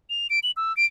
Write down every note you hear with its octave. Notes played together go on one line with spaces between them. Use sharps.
F7
D7
F#7
E6
D7